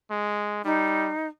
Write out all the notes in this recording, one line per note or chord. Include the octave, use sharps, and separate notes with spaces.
G#3
G3 D#4